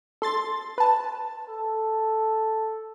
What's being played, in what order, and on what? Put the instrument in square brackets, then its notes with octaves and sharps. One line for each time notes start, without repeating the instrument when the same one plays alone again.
[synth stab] A4 C6 A6
B4 A5
[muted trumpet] A4